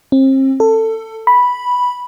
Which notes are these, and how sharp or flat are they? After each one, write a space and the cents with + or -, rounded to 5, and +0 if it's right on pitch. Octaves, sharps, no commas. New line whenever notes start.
C4 +35
A4 +20
B5 -5